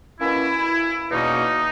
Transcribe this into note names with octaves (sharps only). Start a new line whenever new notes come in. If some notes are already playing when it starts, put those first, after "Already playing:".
B2 A#3 C#4 E4
E2 B2 A#3 C#4 D#4